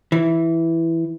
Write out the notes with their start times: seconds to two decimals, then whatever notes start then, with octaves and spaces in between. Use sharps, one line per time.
0.12 E3